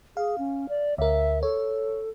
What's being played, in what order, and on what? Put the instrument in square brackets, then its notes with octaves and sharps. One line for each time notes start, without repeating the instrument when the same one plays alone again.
[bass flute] G#4 [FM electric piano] F5
[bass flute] C#4
D5
[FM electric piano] D2 A#4 [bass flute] E5
[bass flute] A4 [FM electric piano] C#5